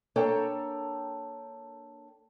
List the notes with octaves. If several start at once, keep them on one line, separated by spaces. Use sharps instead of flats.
A#3 D4 A4 C#5 G5 A#5